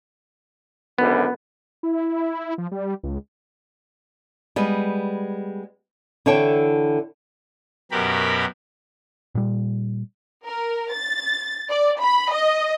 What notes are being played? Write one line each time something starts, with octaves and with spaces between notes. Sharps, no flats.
G#1 F#2 D3 B3
E4
F3
G3
C#2
G3 G#3 B3
D3 E3 E4 A4 C#5 G5
F#2 B2 G4 A#4 B5
A#2 G3
A#4
A6
D5
B5
D#5